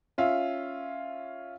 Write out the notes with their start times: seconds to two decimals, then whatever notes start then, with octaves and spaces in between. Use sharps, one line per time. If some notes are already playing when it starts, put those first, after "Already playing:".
0.18 C#4 F4 E5